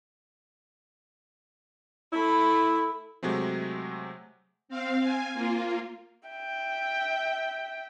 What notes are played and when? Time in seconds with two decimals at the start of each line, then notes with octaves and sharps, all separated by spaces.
2.13 A3 E4 B5
3.23 C3 F#3 G#3 A3 C4
4.68 C4 F5
5.01 G#5
5.33 A#3 F4
6.28 E5 G5